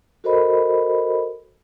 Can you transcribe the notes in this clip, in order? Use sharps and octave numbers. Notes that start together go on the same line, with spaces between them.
F#4 A4 A#4 C5 D#5 B5